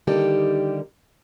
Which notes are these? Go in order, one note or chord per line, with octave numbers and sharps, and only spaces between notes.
D3 D#3 G3 A#3 D#4 G4